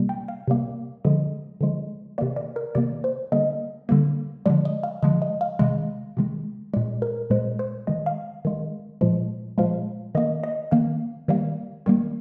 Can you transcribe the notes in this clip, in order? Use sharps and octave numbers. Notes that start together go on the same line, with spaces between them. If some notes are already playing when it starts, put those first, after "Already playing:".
Already playing: C3 G3 A#3
G5
F5
C3 G3 A#3
D3 F3 G#3 D#5
D3 F3 G#3
C3 D#3 A#3 D5
D5
A#4
C3 D#3 A#3 D5
C5
D3 G3 A#3 D#5
D3 G3 A#3
D3 F3 G#3 D5
D#5
F5
D3 F3 G#3 D#5
D#5
F5
C3 D#3 G#3 D#5
C3 D#3 G#3
A#2 G#3 D5
A#4
A#2 G#3 C5
C5
D#3 G#3 D#5
F5
D#3 G#3
A#2 F3 G#3
A#2 F3 G#3 F5
D#3 A#3 D#5
D#5
D#3 A#3 F5
D#3 G3 A#3
D#3 G3 A#3